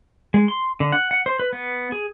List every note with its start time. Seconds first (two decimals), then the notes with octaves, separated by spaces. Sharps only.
0.34 G#3
0.48 C6
0.80 D3
0.92 F#5
1.11 F#5
1.26 C5
1.39 B4
1.53 B3
1.92 G#4